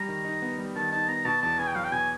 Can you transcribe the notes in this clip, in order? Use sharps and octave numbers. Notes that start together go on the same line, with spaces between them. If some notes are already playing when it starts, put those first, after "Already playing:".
Already playing: G3 A#5
D#3
D#4
B3
G3
D#3 A5
D#4 A5
B3 A#5
B2 A5
E2 A5
B3 G#5
G5
F#3 F5
G5
B2 G#5